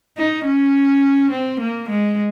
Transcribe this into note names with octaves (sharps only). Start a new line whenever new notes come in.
D#4
C#4
C4
A#3
G#3